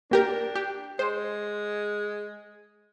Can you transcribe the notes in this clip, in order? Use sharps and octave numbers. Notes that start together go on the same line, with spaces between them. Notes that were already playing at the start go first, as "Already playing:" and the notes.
A#3 D4 G4 A#4
G4
G#3 C5